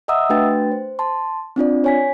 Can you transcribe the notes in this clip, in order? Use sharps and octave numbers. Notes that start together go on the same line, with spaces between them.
D#5 E5 F#5 A#5 D#6 E6
A3 D4 F#4 B4 G5 A6
C5
A5 C6
C4 D4 F4 D5
C#5 G#5 B6